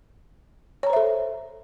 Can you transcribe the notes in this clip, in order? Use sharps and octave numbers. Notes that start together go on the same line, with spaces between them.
A4 C5 C#5 E5 A#5